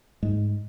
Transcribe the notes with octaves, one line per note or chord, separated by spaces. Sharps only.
G#2 G#3